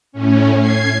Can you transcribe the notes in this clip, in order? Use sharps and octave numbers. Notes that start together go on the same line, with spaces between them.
A2 C#4
G#6 C7